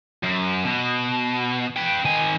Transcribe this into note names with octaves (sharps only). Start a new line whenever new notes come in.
F#2
B2
B4 G5
D#3 G#5